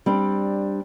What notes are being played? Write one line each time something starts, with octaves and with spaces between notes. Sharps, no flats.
G3 C4 D4